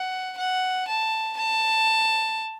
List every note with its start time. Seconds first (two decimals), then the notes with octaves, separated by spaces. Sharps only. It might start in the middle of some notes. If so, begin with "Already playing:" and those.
Already playing: F#5
0.38 F#5
0.88 A5
1.37 A5